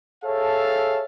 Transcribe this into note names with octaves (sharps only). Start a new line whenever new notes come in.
G#4 A4 C#5 E5 F5 A5